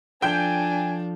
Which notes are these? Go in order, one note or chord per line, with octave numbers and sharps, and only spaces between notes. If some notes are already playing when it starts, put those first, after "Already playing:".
F3 D4 F4 A4 G5 G#5 G6